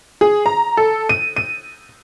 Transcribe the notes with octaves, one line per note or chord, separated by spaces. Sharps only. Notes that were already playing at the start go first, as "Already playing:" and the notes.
G#4
A#5
A4
D#7
D#7